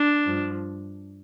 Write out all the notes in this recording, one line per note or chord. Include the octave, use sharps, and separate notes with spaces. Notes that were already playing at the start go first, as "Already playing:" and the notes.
Already playing: D4
G2 F3